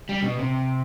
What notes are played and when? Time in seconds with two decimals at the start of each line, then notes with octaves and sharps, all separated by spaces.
0.09 G3
0.23 B2
0.39 C3